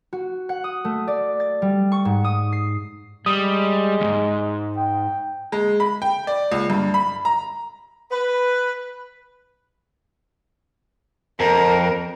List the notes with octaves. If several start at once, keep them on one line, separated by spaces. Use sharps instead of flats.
F#4
F#5
D#6
A3
D5
A6
G3
C#6
G#2
D#6
C7
G3 G#3 D#6
D#2 G#2
G5
G#3
B5
G5
D5
C#2
G2
B5
A#5
B4
F2 A#4